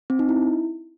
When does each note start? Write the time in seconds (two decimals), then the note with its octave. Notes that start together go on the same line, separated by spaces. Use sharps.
0.10 C4
0.19 D#4
0.29 E4